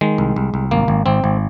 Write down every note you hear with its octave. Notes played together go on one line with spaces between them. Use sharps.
D#3 G#3
C2
C2
C2
G#1 A#3
G#1
G#1 C4
G#1